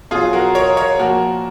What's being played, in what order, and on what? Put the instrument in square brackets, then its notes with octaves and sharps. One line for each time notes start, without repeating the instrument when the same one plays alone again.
[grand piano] B2 F#3 F4 G#4
F#4 A#4
A#4 C#5
A#4 C#5
A#2 F3 F#4 A#4